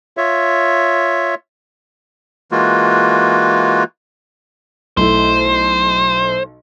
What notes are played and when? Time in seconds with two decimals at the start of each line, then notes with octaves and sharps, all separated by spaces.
0.17 F4 C#5 E5
2.52 E3 G#3 A#3 F4 F#4
4.97 B1 A3 E4 C5